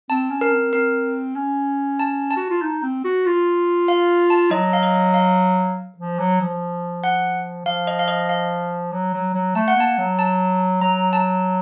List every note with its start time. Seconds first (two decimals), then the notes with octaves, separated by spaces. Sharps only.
0.10 C4 A5
0.31 C#4
0.41 A#4
0.52 C4
0.73 C4 A#4
1.36 C#4
1.99 A5
2.31 A5
2.37 F#4
2.50 F4
2.62 D#4
2.83 C4
3.04 F#4
3.26 F4
3.88 F5
4.30 A5
4.51 F#3 D#5
4.73 F5
4.83 D#5
5.14 F5
5.98 F3
6.19 F#3
6.41 F3
7.04 F#5
7.66 F3 F5
7.87 D#5
7.99 F5
8.08 D#5
8.29 F5
8.92 F#3
9.14 F#3
9.34 F#3
9.55 A3 A5
9.68 F#5
9.77 A#3 A5
9.98 F#3
10.19 A5
10.81 F#3 A#5
11.13 A5